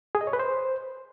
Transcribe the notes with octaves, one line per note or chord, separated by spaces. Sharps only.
G#4
D#5
C#5
B4
C5